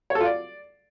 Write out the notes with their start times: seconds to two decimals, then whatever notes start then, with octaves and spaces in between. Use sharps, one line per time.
0.10 C#5
0.15 A4
0.20 F4
0.25 D5